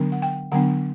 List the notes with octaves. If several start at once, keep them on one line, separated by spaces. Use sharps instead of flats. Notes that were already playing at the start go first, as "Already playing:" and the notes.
Already playing: D3 F#3 B3 D4
F#5
G5
D3 F#3 B3 D4 F#5